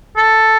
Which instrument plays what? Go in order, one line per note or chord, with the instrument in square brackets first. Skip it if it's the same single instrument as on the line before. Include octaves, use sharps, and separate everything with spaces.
[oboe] A4